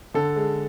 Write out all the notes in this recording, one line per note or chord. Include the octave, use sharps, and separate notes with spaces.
D3 A4
G#3